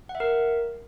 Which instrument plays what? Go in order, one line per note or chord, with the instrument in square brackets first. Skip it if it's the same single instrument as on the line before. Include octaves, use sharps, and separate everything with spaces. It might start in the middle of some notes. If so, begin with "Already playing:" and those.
[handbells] F#5
E5
A#4